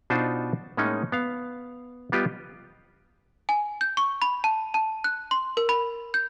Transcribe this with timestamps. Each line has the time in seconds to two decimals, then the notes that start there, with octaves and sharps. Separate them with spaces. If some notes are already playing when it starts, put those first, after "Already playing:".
0.10 B2 D4 D#4 F4 C5 A5
0.77 A2 G#3 A#3 C#4 D#4
1.12 B3 F5
2.12 G3 B3 F4 G4 D#5
3.49 G#5
3.81 G6
3.97 C#6
4.22 B5
4.44 A5
4.74 A5
5.04 F#6
5.31 C6
5.57 A#4
5.69 B5
6.14 G6